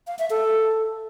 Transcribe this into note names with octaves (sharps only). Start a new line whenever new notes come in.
F5
E5
A4